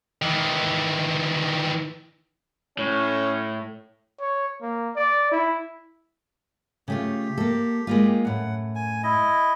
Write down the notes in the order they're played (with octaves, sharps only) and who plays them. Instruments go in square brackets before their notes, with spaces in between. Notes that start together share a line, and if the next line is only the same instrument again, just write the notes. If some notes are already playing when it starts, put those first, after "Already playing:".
[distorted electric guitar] D#3 E3
[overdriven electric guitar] A2 [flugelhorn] C#4
[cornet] C#5
A#3
D5
E4
[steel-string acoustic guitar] C#3 A3 F4 [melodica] G4
[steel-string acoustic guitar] A#3 A4
G#3 A#3 F4
[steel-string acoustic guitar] F#2 A2 [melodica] F#5
[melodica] G#5
E4 D#5